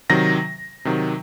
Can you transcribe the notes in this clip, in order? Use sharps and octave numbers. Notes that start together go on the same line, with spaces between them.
C3 D#3 F#3 A#6
C3 D#3 F#3